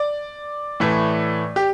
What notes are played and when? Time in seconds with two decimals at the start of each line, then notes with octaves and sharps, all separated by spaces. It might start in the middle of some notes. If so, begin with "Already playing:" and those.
Already playing: D5
0.80 A2 E3 A3
1.56 G4